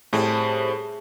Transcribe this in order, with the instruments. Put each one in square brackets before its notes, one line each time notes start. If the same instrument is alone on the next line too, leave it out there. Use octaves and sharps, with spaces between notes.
[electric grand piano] A2 [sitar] G3 C4 [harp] G#4 A5